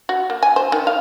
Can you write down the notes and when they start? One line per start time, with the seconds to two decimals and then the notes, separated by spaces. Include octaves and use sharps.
0.09 F#4
0.30 A#3
0.43 G#5
0.56 C5
0.72 D#3
0.87 F5